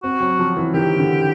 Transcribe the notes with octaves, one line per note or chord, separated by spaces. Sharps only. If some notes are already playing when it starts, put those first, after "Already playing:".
C4 F#4
F#3
F3
E3
D#3 G4
D3